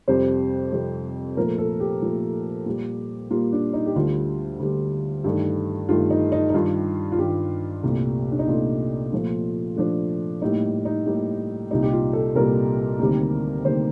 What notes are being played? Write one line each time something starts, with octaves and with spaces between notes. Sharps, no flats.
F2 C3 G3 C5
F2 C3 G3
A#2 F3 A3 A#4
A4
G4
A#2 F3 A3
A#2 G3 A#3
A#2 G3 A#3 F4
D4
D#4
G4
D2 D3 G3 F4
D2 D3 G3
G2 D#3 A3
G2 D#3 A3 F4
D#4
D#4
D#4
G2 D#3 G3 F4
F4
G2 D#3 G3 G4
C2 A#2 A3
D4
D#4
C2 A#2 A3 F4
A#2 F3 A3
A#2 F3 A3 D4
A2 G3 A#3 D#4
D#4
A2 G3 A#3
C2 A#2 G3 D#4
G4
F4
A4
C2 A#2 G3 A#4
D2 C3 D#3 G3 A#3
D2 C3 D#3 G3 A#3 C5